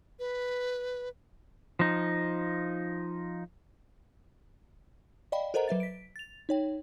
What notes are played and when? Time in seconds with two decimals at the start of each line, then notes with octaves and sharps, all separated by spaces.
0.19 B4
1.79 F3 D#4
5.32 D5 D#5 F5 G5 B5
5.54 A4 A#4 C5 D#5 F#5 A#5
5.68 F#3 B4 E5 A6
5.80 B6 D7
6.16 A6 F7
6.49 D#4 C#5 G5